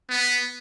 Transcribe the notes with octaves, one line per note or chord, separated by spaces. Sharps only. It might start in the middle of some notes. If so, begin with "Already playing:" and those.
B3